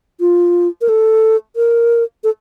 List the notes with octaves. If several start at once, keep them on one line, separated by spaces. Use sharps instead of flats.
F4
A#4
A4
A#4
A4